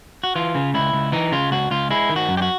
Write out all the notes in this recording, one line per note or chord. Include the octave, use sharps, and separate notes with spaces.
F#4
E3 F4
C#3
C#2 E4
C#2
E3 D#4
C#3 F4
C#2 F#4
C#2 F4
G#3 E4
D#3
F#4
F#2
G4
F#4